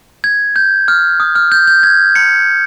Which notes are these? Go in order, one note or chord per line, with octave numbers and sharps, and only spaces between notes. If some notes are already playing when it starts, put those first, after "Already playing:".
G#6
G6
F6
D#6
F6
G6
G6
G#6
C#7